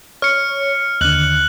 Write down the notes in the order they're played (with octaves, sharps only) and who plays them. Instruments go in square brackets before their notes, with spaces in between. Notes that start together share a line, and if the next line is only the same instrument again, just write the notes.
[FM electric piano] C#5 [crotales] F6 C#7
[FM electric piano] D#2 D3 [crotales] F#6 F#7